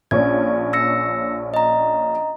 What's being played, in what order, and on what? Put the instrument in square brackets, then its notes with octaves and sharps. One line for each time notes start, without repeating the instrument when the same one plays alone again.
[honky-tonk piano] A#1 C#4 D4 [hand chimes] G#6
[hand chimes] E6 A#6 C#7
D#5 A#5